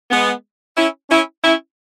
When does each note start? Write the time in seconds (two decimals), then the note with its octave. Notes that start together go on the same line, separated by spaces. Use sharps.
0.10 G#3 B3
0.76 C#4 E4
1.10 C#4 E4
1.42 C#4 E4